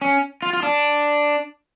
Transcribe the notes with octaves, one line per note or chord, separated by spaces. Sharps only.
C#4
F4
F4
D4